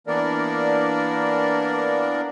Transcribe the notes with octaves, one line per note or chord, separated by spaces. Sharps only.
E3 A#3 B3 D4 A#4 D5